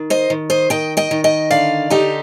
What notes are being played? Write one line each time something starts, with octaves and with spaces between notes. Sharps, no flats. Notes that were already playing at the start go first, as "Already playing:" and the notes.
Already playing: D#3
C5 D#5
D#3
C5 D#5
D#3 D#5 G5
D#5 G5
D#3
D#5 G5
D3 D5 F5
D3 D#4 G4